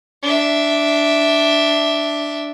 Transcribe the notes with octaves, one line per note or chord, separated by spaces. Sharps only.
D4 E5